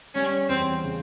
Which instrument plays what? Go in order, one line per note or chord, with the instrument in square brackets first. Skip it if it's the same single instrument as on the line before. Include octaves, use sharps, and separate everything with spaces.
[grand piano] G3 [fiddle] C#4
[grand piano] E2 [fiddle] C4
[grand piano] C#3